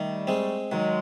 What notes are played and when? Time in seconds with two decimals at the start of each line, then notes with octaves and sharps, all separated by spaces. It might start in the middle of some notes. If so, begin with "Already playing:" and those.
Already playing: D#3 G3 A3
0.27 G#3 C4
0.72 D#3 F#3 G#3